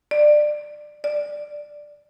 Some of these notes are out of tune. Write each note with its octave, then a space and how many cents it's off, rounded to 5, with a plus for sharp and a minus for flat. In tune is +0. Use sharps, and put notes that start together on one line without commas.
D5 +20
D5 +5